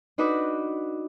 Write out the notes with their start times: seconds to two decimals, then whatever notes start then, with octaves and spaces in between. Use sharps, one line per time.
0.18 D4 D#4 F#4 B4 D6